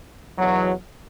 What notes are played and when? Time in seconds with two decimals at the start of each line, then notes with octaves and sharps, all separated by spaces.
0.39 E2 B2 F#3